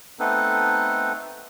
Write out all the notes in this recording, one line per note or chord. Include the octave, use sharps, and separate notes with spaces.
A3 B3 C4 D#4 A4 B4